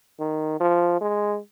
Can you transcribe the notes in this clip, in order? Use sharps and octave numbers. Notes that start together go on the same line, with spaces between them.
D#3
F3
G#3